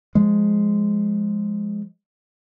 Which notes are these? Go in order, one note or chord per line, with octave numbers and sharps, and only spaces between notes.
F3 G#3